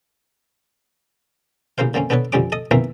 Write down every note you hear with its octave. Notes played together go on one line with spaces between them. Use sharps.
A1 C#3 A#3 C5 F5
D3 A#3 C4 C#4
B3 D4 A4 B4 C#5
F2 D3 G3 C#4 D6
A4 D#5 D#6
B1 E3 A#3 C4 A#4 E5